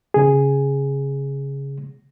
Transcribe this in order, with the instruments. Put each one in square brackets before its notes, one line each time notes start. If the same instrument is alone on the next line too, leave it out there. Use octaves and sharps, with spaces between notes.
[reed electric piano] C#3 G#4